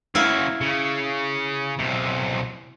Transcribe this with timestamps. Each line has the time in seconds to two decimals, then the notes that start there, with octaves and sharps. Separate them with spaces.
0.15 C#3 F#3 E4 F5
0.61 C#3
1.79 B1 C3